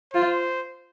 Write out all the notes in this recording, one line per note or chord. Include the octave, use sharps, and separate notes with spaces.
F4 C5